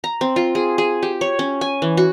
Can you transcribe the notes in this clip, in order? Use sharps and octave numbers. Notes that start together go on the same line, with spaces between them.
A#5
C4
F4
G#4
G#4
G4
C#5
C#4
G#5
E3
F#4